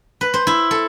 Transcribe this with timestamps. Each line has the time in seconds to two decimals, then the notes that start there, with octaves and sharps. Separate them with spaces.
0.21 B4
0.34 C5
0.47 E4
0.71 A4